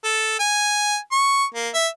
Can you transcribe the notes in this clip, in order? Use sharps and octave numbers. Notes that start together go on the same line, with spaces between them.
A4
G#5
C#6
A#3
E5